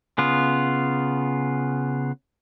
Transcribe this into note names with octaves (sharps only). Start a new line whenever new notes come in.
C#3 B3 F4